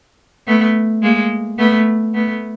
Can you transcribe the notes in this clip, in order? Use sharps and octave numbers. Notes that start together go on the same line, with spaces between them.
A3 B3
G#3 A#3
A3 B3
A3 B3